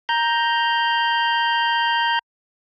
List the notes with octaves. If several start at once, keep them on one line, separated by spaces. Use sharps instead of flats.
A#5 G6